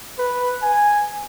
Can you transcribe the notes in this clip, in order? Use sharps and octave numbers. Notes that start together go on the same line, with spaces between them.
B4
G#5